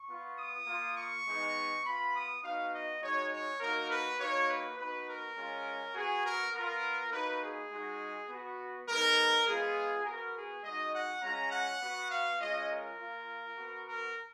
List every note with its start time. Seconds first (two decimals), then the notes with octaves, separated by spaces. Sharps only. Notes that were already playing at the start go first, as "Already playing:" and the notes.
Already playing: C#6
0.09 B3 F4
0.37 D#6
0.67 A#3 F4
0.97 C#6
1.25 G#3 B3 D#4
1.84 B3 F4 B5
2.14 D#6
2.42 B3 D#4 F#4 F5
2.72 D#5
3.02 G#3 D#4 F#4 C#5
3.31 C#5
3.60 A#3 D#4 F#4 A#4
3.89 B4
4.19 A#3 D#4 F#4 C#5
4.48 B4
4.78 B3 D#4 F#4 B4
5.07 A#4
5.37 G#3 C#4 F4
5.95 B3 F#4 G#4
6.24 A#4
6.53 B3 F4 A#4
7.12 A#3 D#4 F#4 B4
7.42 G#4
7.71 G#3 D#4 F#4
8.30 B3 F#4
8.88 G#3 B3 D#4 A#4
9.46 G#3 B3 F4 G#4
10.06 B3 F#4 A#4
10.35 G#4
10.64 G#3 D#4 F#4 D#5
10.94 F#5
11.22 G#3 C#4 F4 A#5
11.52 F#5
11.82 B3 F#4
12.11 F5
12.40 G#3 C#4 F4 D#5
12.70 A#4
12.98 A#3 F4
13.57 B3 F#4
13.86 A#4